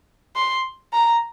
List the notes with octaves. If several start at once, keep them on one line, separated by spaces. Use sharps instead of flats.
C6
A#5